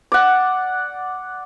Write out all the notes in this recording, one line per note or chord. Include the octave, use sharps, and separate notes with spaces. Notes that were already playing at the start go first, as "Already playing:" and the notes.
D5 F#5